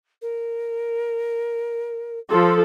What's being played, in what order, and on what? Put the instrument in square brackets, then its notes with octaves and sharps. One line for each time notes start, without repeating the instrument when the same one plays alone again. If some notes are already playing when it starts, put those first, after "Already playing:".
[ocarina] A#4
[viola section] F3 A4 [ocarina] C6